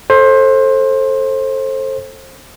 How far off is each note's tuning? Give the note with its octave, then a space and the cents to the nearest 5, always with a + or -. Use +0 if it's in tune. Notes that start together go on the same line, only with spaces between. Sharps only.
A4 +0 C5 +25